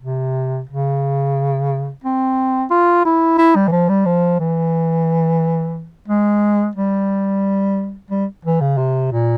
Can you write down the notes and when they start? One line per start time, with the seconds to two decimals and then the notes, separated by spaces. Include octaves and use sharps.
0.01 C3
0.69 C#3
2.04 C4
2.71 F4
3.06 E4
3.38 E4
3.56 G3
3.68 E3
3.72 F3
3.89 G3
4.06 F3
4.40 E3
6.08 G#3
6.75 G3
8.10 G3
8.45 E3
8.61 C#3
8.78 C3
9.12 A#2